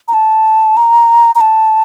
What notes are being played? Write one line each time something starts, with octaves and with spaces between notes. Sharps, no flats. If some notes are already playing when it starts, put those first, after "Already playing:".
A#5
A5
A#5
A#5
A5